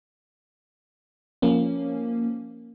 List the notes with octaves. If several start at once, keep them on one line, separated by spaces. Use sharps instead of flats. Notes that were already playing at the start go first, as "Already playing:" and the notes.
F3 A#3 C#4